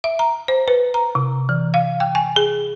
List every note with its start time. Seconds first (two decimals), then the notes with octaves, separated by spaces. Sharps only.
0.04 E5
0.19 A#5
0.48 C5
0.68 B4
0.94 A#5
1.15 C3
1.49 E3
1.74 F5
2.00 G5
2.15 G#5
2.36 G#4